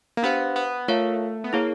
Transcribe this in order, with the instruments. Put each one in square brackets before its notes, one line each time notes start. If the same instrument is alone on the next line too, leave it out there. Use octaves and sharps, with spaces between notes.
[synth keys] A#3
[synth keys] B3 [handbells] D4 G4 C5 F5
[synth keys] B3
[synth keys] A3 [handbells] F4 A#4 C#5 F5
[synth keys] B3
[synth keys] A#3 [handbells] E4 G#4 C#5